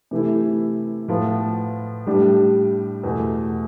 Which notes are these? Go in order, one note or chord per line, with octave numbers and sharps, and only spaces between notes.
C3 E3 A3 E4
A2 F3 B3 F4
A2 G3 D4 G4
E2 B2 A3